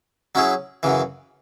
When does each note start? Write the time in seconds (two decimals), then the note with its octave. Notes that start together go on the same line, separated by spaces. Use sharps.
0.35 F#3 C#4 E4 G#4
0.83 F#2 C#3 E3